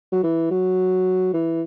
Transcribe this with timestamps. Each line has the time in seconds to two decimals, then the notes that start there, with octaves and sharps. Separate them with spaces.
0.12 F#3
0.23 E3
0.51 F#3
1.33 E3